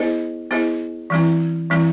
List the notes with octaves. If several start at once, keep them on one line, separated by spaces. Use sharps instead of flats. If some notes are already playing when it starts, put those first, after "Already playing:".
Already playing: B3 E4 G#4 C5 D#5
B3 E4 G#4 C5 D#5
E3 G3 C4 E4
E3 G3 C4 E4